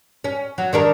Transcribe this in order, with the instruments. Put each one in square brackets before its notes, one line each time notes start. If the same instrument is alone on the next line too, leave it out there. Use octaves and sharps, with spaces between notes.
[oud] C#4
F#3
D#3 D4 A#4